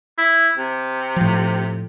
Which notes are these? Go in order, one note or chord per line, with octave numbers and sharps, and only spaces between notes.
E4
C3
A2 F3